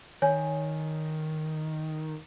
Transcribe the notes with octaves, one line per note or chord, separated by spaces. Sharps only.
D#3 C#5 G#5